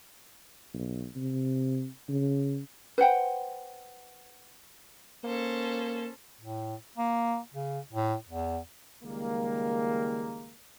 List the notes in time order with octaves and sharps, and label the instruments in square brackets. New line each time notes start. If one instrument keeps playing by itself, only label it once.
[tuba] B1
C3
C#3
[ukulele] B4 C5 F#5 G5
[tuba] A#3 [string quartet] C#4 A4 C5
[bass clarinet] A2
A#3
C#3
A2
E2
[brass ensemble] C#2 D#3 G3 G#3 A#3